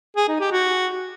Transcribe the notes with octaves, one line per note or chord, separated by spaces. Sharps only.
G#4
D#4
G4
F#4